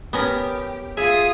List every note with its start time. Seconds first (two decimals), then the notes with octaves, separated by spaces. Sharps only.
0.13 B3 C#4 G4 A#4
0.97 F4 G#4 E5 D#6